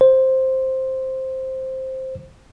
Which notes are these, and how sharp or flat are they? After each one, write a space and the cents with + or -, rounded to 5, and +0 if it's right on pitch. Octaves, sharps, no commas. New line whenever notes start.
C5 +5